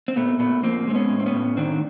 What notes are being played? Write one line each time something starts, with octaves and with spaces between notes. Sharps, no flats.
C4
A#2 A3 B3
A#2 A3 B3
F3 A#3 C4
G#3 C4
B3 C#4
A2
C4
B3 C#4
A2
D#3 C4 D4